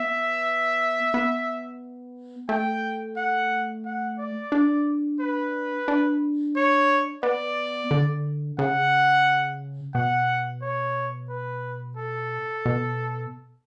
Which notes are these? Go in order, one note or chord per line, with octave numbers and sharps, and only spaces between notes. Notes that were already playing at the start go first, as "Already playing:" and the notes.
Already playing: B3 E5
B3
A3 G5
F#5
F#5
D5
D4
B4
D4
C#5
B3 D5
D3
C#3 F#5
B2 F#5
C#5
B4
A4
B2